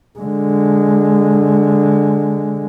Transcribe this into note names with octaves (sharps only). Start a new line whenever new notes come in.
D3 G#3